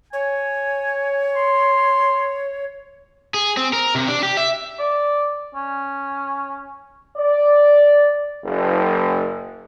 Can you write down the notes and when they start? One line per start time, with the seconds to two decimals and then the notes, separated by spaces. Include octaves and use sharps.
0.13 C#5 G#5
1.36 C6
3.34 G#4
3.57 C4
3.73 A#4
3.95 C3
4.08 D4
4.23 G4
4.37 E5
4.80 D5
5.55 C#4
7.17 D5
8.44 F#1